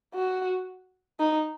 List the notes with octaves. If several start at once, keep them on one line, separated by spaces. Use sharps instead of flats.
F#4
D#4